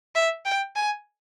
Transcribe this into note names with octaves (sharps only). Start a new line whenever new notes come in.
E5
G5
G#5